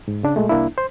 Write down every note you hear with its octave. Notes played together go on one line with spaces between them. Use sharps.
G#2
C#3 D4
A#2 G#3 A3
C2 A#3 D4 E4
C5